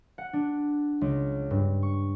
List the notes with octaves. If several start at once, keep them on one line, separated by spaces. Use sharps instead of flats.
F#5
D4
C#2
G2
C#6